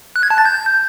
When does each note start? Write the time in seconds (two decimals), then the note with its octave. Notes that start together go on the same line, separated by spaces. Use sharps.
0.16 F#6
0.23 G#6
0.31 A5
0.38 A6
0.45 G6